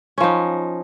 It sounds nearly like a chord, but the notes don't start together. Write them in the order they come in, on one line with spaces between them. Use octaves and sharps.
C#4 F3 D#4